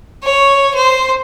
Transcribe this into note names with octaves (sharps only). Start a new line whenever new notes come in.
C#5
C5